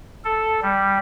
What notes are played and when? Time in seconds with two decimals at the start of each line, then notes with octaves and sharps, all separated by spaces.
0.24 A4
0.63 G3